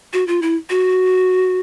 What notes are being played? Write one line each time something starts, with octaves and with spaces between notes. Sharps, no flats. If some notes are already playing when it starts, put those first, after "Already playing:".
F#4
F4
E4
F#4